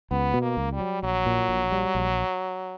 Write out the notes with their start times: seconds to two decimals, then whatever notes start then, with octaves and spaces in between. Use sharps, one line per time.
0.11 C#2 B3
0.34 B2
0.42 A#3
0.57 C#2
0.73 G3
0.80 F#3
1.03 A#1 F#3
1.26 A#2
1.49 A#1
1.72 G3
1.95 A#1